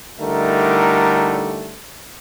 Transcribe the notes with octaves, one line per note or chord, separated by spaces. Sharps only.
D3 G3 A3 D#4 E4 A#4